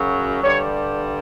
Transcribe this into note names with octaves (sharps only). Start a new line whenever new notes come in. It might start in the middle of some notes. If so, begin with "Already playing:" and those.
Already playing: F#2 C#3 F#3
G2 D3 G3 C#5